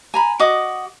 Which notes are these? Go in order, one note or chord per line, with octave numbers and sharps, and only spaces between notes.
G#5 A#5 B5
F#4 D#5 D6 D#6